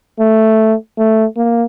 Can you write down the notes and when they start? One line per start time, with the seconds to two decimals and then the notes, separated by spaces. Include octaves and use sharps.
0.20 A3
0.98 A3
1.37 A#3